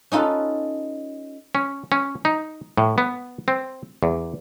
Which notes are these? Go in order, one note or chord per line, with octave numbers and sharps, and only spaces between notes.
C#4 D#4 F4 A4 B4
C#4
C#4
D#4
A2
B3
C4
E2